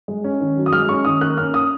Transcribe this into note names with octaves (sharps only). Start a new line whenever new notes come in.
G#3
C#4
D#3
F#3
D#6
G#3 F6
C#4 C#6
D#3 D#6
A#3 F#6
C#4 F6
D#6